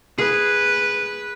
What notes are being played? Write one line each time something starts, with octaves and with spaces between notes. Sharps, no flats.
G#4 B4